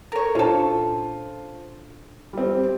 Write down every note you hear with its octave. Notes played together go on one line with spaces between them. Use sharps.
A4 A#4 C#5
A#2 C#4 D4 F4 A4 C5
G3 C4